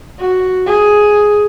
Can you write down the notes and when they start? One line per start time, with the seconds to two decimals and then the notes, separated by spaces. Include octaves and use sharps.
0.19 F#4
0.67 G#4